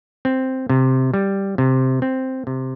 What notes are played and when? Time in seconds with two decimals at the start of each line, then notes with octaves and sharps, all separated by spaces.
0.25 C4
0.69 C3
1.14 G3
1.58 C3
2.02 C4
2.47 C3